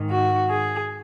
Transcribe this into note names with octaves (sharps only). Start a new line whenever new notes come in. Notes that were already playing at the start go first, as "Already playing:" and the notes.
Already playing: G#2 D#3
F#4
G#4